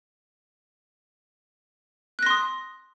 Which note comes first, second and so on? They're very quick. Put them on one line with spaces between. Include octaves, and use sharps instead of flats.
F#6 A#6 C6 D#6